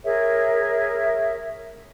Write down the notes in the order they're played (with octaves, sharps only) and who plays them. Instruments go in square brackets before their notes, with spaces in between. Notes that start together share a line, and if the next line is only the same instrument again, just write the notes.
[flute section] G#4 A#4 C#5 E5